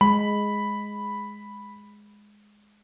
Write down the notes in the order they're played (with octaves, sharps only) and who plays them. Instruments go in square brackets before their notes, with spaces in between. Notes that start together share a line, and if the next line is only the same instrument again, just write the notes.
[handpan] G#3 [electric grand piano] B5